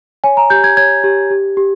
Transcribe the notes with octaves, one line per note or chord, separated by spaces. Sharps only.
C#5 G#5
A#5
G4 G6
G#6
C#5 G#6
G4
G4
G4